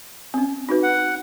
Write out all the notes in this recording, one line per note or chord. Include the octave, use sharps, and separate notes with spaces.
C4 C#4
D#4 F#4 B4
F#5